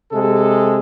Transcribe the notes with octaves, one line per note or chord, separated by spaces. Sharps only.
C3 G#3 A4